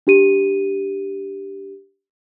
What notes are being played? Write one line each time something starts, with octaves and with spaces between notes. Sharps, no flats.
D4 G4 D#7